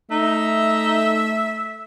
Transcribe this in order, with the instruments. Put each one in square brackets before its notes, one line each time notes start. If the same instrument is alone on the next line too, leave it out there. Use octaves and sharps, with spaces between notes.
[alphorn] A3 [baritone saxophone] D#4 [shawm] E5